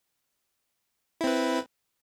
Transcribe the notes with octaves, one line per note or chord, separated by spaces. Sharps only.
C4 E4 B4